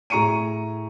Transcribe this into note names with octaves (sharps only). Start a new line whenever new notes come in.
A2 G#4 A#5 C#6 C#7 D#7